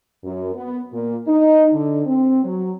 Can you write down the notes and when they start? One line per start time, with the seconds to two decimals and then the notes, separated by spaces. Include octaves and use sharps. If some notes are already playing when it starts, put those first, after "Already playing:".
0.24 F#2
0.55 B3
0.92 A#2
1.27 D#4
1.73 D3
2.06 C4
2.44 F#3